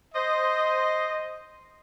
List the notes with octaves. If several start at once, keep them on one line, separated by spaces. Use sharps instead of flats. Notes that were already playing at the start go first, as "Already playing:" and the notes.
C5 D#5